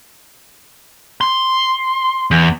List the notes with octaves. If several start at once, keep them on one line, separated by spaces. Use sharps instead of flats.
C6
E2